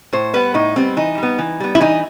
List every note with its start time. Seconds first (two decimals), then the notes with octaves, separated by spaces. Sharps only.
0.13 A2 C5
0.33 G3 B3 B4
0.54 A2 D#4
0.76 G3 B3 C4
0.97 E3 D#4
1.18 G3 B3
1.39 E3
1.60 G3 B3
1.75 E4
1.81 E3 D#4